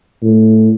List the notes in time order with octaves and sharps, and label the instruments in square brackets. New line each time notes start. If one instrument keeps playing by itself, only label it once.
[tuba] A2